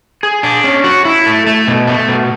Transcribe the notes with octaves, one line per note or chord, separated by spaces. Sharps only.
G#4
D4
C#4
F#4
E4
A3
A3
B2
A3
B2